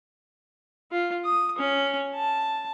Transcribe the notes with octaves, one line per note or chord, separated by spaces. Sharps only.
F4
D#6
C#4
A5